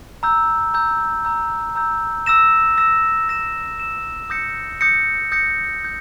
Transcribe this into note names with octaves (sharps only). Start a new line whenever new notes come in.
A#5 E6 G6
A#5 E6 G6
A#5 E6 G6
A#5 E6 G6
E6 A#6 E7
E6 A#6 E7
E6 A#6 E7
E6 A#6 E7
D#6 G6 A#6 C#7
D#6 G6 A#6 C#7
D#6 G6 A#6 C#7
D#6 G6